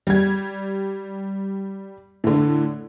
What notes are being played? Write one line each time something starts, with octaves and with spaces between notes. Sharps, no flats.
G3 G#6
A2 D3